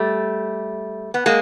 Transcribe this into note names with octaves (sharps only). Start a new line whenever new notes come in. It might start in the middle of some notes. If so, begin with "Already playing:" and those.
Already playing: G3 A3
B3
G#3 A#3